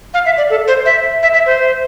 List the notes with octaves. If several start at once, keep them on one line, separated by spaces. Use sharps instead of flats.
F5
E5
D5
A4
C5
E5
E5
E5
C5